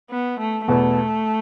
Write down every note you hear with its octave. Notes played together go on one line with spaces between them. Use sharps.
B3
A3
E2 B2 A3 B3